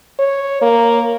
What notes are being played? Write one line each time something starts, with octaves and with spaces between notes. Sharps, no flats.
C#5
A#3